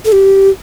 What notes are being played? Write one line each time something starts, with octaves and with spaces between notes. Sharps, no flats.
A4
G4